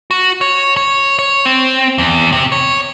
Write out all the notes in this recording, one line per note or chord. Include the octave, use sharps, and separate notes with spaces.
F#4
C#5
C#5
C#5
C4
E2
C3
C#5